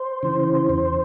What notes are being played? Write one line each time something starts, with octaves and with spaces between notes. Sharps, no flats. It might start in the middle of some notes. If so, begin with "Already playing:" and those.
Already playing: C5
C#3 E3
E2